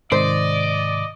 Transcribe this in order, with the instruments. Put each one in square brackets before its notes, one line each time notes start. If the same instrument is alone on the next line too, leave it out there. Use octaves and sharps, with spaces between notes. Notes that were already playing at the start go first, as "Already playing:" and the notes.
[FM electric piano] G#2 C3 D#3 [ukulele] C5 [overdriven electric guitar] D5 [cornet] D#5